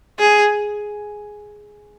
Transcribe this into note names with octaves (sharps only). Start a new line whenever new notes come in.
G#4